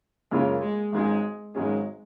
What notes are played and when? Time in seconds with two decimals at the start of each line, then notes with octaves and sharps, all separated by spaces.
0.31 F#2 C#3 G#3 A#3 C#4 F4
0.62 G#3
0.92 G#1 G#2 F#3 G#3 C#4 G#4
1.55 G#1 G#2 F#3 G#3 C#4 G#4